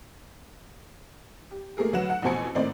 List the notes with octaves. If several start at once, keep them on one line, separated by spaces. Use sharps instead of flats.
G4
A3 A#3 G4 G#4 A#4
D2 F#3 B4 F#5 E7
F#5
A1 F2 B2 C5 G#5 C#7
G#1 A2 A#3 C4 C5 D5